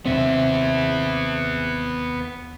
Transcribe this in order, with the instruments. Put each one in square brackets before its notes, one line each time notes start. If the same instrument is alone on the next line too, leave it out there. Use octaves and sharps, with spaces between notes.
[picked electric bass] D#2 C3 C4 [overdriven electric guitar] B3 E5